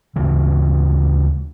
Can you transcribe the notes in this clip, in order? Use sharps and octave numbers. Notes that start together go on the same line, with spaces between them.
D2 C#3 E3